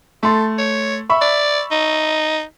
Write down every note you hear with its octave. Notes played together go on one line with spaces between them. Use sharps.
A3 A4 C6
C#5
E5 B5 C#6
D5
D#4